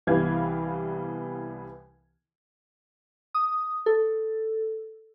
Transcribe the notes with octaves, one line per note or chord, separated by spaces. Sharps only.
C2 E3 G3 B3 F5 G#6
D#6
A4